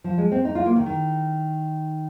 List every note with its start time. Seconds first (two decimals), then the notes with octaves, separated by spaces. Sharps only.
0.04 F3
0.18 G#3
0.32 C4
0.45 D#4
0.55 F4
0.66 A#3
0.76 D#3
0.86 D#3